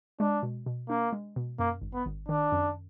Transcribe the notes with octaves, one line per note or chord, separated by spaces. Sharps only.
G#3 D4
B2
B2
A#3 D4
G#3
B2
F#2 A#3
G#1
B3
G#1
D#3 D4
F#2